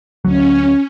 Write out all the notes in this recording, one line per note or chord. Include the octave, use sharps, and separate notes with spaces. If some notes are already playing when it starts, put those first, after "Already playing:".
D2 F#3 C#4